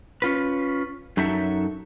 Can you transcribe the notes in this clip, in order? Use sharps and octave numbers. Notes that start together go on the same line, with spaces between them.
C#4 F4 B4
F#2 F#3 D#4 A4 E5